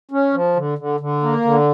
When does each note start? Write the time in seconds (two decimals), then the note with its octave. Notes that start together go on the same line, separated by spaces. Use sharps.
0.11 C#4
0.34 F3
0.56 D3
0.78 D3
1.00 D3
1.23 A#3
1.45 D3